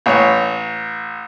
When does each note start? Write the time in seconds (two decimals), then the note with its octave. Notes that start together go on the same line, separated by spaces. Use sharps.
0.06 A1 C#5